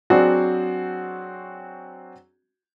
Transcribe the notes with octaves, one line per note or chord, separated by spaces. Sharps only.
F#3 C4 D4 F#4 G#4